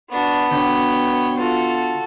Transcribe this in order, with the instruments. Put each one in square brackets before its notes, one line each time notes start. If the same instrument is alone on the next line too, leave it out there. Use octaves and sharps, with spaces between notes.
[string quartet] B3 [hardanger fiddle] D4 F#4
[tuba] B2 [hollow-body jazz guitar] D3 [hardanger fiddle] C#5 G5
[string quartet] F4 [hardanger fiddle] F#4 A4